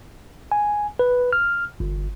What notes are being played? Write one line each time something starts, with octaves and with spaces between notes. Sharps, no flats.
G#5
B4
F6
G1